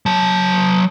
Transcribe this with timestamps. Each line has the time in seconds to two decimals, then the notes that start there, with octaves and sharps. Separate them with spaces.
0.06 F#3 A5